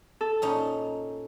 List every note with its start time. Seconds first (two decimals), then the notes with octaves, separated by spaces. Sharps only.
0.21 A4
0.42 A#2 C#4 D#4